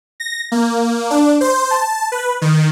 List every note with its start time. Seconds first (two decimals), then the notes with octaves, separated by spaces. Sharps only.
0.20 A#6
0.52 A#3
1.10 D4
1.41 C5
1.71 A5
2.12 B4
2.42 D#3